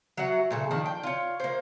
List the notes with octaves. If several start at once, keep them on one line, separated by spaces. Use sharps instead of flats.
F#3 F#4 E5 F#5
A#2 C#3 A4
D#3 F3 D4
G5
F4 C#5
A#3 C5